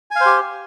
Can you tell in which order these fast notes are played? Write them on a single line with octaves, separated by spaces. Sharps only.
G#5 F5 C5 G4